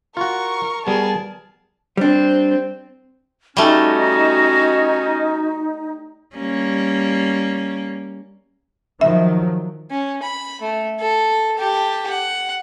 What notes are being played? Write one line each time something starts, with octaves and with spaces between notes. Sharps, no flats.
F4 F#4 A#4 C#6
G3 B3 G#4 A#4 A5
G3 C4 D4 C5
G3 A3 C#4 D#4 F#4
G3 A#3 C#4
D#3 F3 F#3 E5
C#4
B5
A3
A4
G4 A5
F#5